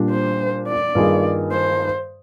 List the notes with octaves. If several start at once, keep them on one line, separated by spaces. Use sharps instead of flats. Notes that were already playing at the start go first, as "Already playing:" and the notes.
Already playing: A#2 G3 D4
C5
D5
G2 D#3 A#3 F4 G#4
C5